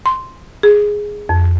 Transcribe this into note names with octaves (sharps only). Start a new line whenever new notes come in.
C6
G#4
F2